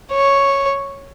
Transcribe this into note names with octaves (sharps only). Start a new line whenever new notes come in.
C#5